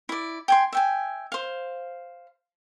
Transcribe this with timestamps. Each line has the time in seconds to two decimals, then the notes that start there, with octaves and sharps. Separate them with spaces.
0.09 E4 D5
0.48 G5 G#5 C6
0.73 E5 G5 G#5
1.32 C5 F5